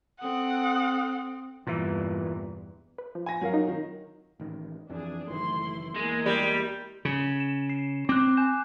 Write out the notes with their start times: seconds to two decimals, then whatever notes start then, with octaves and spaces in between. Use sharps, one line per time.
0.21 C4 A4 F#5 D#6
1.67 E2 G2 A#2 E3
2.98 B4
3.15 F3
3.26 G#5 A#6
3.41 F#3 A#4 F5
3.54 D#4
3.67 D#3
4.40 A1 D#3
4.90 F2 E3 D4 G#4
5.30 F#1 D#3 E3 A3 E4 C6
5.96 E2 G#3 A#3 E4
6.26 G3
7.05 C#3
7.40 E7
7.70 C7
8.09 C4 D6 F#6
8.37 G#5 G6 E7